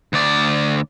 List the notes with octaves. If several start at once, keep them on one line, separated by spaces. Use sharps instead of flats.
D2 D5